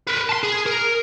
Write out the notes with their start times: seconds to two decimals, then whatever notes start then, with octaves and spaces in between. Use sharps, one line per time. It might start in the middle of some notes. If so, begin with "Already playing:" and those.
0.07 A#4 B4
0.29 A5 C6
0.44 G#4
0.66 A#4